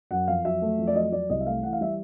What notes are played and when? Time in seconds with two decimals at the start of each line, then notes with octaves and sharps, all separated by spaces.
0.11 F#2 F#5
0.28 F2 F5
0.45 F#3 E5
0.62 A3
0.78 F2
0.87 D5
0.95 F#3 D#5
1.12 F#3 D5
1.30 C2 D#5
1.41 E5
1.46 A3 F5
1.63 E3 F#5
1.73 F5
1.81 G3 E5